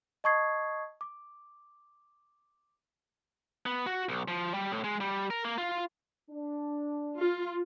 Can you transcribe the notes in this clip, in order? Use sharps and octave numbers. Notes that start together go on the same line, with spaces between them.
D#5 A5 C#6 D#6 G#6 C7
D6
B3
F#4
B1
F3
G3
A2
G#3
G3
A#4
A#3
F4
D4
F4